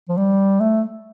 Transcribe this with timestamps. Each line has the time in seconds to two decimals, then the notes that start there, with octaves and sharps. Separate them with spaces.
0.09 F3
0.18 G3
0.61 A3